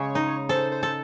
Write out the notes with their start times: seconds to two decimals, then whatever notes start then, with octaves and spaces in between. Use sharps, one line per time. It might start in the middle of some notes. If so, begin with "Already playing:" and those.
Already playing: C#3 G#3 C#5
0.15 D#4
0.49 A4 C5
0.72 C5
0.83 A4